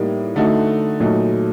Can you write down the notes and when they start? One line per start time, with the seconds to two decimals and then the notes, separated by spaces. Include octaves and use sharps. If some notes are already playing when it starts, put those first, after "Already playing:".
Already playing: A2 G3 A#3 D#4
0.35 D3 A3 D#4 F#4
1.00 A#2 F#3 A3 D#4